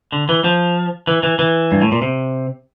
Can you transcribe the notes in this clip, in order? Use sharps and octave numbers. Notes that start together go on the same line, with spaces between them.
D3
E3
F3
E3
E3
E3
G2
A2
A#2
C3